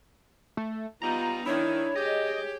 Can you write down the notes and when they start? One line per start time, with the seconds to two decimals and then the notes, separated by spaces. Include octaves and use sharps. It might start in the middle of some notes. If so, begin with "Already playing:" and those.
0.57 A3
1.02 G3 B3 D#4 F4 A#5
1.46 D#3 D4 E4 C#5
1.96 G4 G#4 D#5